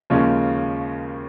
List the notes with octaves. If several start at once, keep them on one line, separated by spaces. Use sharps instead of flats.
D#2 C#3 F3 G#3 C#4